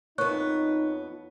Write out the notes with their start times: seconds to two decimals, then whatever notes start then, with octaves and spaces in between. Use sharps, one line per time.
0.18 F2 B3 D#4 A#4 C#5 C#6 F#6